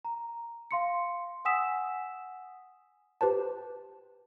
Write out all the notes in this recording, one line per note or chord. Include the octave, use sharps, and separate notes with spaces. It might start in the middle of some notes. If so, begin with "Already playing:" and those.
A#5
F5 C6 C#7
F#5 G#5 D#6 E6 B6 E7
G4 B4 C5 A5